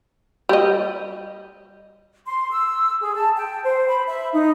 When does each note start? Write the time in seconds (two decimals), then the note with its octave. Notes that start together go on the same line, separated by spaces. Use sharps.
0.49 G3 D#5
2.26 C6
2.51 E6
3.01 G#4
3.16 A5
3.36 G5
3.64 C5
3.88 B5
4.07 E5
4.34 D#4